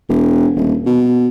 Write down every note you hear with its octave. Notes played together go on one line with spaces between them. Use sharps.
E1
D#1
B2